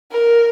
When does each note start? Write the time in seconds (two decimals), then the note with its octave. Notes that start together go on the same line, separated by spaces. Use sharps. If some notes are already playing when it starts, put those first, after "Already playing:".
0.12 A#4